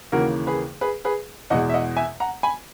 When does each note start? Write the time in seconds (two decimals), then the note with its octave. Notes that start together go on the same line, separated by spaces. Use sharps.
0.12 D#2 C#3 E3 A#3 F#4 A#4
0.47 G#4 B4
0.81 G#4 B4
1.05 G#4 B4
1.50 E2 B2 G#3 D#5 F#5
1.70 E5
1.74 D#5 F#5
1.97 E5 G#5
2.20 F#5 A#5
2.43 G#5 B5